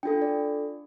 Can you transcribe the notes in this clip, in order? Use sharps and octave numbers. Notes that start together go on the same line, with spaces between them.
D4 F4 A4 G5
D5